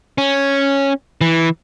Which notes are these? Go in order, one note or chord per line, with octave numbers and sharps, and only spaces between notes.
C#4
E3